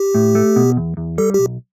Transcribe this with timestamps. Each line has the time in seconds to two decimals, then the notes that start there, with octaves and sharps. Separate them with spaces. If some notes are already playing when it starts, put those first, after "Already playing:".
Already playing: G4
0.14 A2
0.35 A3
0.56 B2
0.77 E2
0.97 E2
1.18 G3 A4
1.34 B1 G4